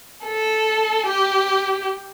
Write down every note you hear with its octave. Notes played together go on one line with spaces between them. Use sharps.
A4
G4